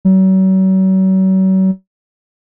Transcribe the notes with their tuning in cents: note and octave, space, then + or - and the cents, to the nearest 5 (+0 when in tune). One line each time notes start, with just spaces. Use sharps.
F#3 +40